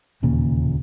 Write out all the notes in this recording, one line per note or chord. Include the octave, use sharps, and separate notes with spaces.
E1 D#2 A#2 C#3